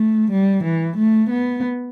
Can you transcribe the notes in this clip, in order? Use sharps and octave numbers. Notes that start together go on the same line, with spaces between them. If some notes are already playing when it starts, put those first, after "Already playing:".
Already playing: A3
G3
E3
A3
B3